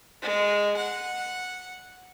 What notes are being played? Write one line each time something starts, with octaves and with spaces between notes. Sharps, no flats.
G#3
F#5